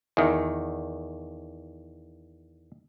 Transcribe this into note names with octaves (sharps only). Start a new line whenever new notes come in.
E2 D#3